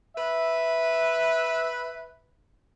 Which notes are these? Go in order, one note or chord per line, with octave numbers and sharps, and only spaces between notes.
B4 E5